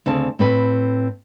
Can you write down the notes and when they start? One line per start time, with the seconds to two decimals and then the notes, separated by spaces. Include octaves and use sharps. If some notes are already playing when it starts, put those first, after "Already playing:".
0.06 D2 C#3 C4 A5
0.39 A2 C4 B4